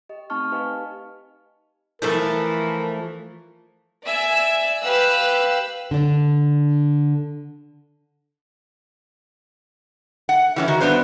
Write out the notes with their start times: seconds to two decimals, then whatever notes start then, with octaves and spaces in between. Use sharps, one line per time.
0.09 G4 D#5
0.30 A3 C4 D#4 A5 C#6 F6
0.51 D#4 G4 B4 D#5 F5 G#5
2.02 E3 F3 A3 A4 A#4
4.05 D5 E5 G#5 E6
4.84 G4 B4 F5 E6 F#6
5.91 D3 D4
10.29 F#5
10.56 E3 G3 C#4
10.68 D#3 F#4
10.80 G2 F3 B3 D4 B4 C5